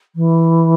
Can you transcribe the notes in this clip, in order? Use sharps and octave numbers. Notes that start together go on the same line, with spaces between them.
E3